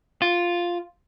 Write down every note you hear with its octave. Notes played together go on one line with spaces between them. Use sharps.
F4